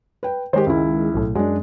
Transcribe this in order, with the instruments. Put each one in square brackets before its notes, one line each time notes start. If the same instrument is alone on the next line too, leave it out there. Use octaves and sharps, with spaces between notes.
[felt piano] B4 G5
[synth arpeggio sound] D#3 G#3 [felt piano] G4 C5
[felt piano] C#2 E4
[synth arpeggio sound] B1 A2
[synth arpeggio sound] F#2 [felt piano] G#3 D4